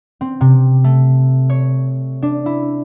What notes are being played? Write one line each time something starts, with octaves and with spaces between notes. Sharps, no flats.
C4
C3
A3
C#5
D4
E4